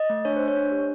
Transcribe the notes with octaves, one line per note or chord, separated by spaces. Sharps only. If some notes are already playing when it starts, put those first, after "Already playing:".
Already playing: D#5
A3
D4 C#5
D4 C5
C#5
D4
G4